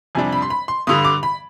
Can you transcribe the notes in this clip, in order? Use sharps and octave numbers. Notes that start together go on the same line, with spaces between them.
F2 C3 G3 D4 G#5
B5
C6
B5
C6
G2 D3 G3 D#6
D6
B5